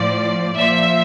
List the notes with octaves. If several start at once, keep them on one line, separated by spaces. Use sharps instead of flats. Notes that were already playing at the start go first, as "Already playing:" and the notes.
Already playing: A2 F3 D5
A#2 F3 E5